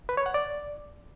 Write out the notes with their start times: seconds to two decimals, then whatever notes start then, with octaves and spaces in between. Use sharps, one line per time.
0.09 B4
0.17 C#5
0.26 F#5
0.34 D5